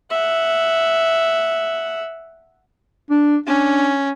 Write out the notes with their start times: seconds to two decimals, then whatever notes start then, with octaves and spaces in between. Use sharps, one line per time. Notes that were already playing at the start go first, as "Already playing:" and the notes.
0.11 E5 F#5
3.11 D4
3.46 C#4 D4